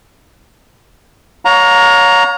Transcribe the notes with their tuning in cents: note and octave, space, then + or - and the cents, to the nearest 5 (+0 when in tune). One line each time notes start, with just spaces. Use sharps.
C#5 +20 F5 +40 A#5 +0